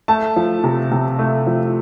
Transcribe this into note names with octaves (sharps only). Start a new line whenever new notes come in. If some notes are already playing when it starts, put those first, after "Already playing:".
A3 A5
F3
C3
C3
A3
F3